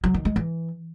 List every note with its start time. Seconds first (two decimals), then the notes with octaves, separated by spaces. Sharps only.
0.04 F#3
0.14 D#3
0.25 G#3
0.36 E3